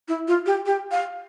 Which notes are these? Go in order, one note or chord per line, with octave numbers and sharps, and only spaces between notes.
E4
F4
G4
G4
F5